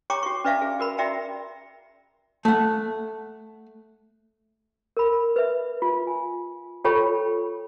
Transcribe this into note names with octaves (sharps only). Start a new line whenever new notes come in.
G4 C#5 G5 A#5 C#6 D6
F#4 C#6
C#4 B4 D5 E5 F5 A5
G#4
F#4 A#4 B5
F#4 D5 E5 G5 A#5
A3 F#5
A#4 B5
B4 E5
F4
G#5
F4 A4 C#5 G5 B5 C#6